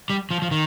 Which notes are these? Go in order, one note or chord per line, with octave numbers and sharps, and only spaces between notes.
G3
F3
F3
D#3